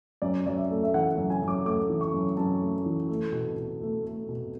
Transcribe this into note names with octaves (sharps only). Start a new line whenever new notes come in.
F#2 D5
F#2 D5
E5
A3
E5
E3 F#5
F#5
F#2
G#5
F#2
D6
A3 D6
E3
C#6
F#2
F#2 A5
A3
E3
A3
B2
B2
A3
A3
B2